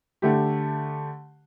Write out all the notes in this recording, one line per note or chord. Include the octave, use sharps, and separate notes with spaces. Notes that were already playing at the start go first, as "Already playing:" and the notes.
D3 A3 G4